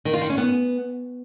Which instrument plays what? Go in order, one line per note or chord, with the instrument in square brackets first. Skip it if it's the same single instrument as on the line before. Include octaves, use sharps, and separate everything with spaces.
[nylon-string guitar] D#3
F4
D#3
C#4
B3